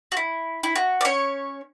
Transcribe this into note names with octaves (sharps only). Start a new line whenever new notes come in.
F#4
E4
E4
F#4
D5
C#4 C#5